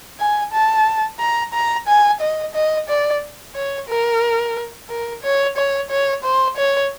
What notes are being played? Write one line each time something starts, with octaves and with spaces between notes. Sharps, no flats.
G#5
A5
A#5
A#5
G#5
D#5
D#5
D5
C#5
A#4
A#4
C#5
C#5
C#5
C5
C#5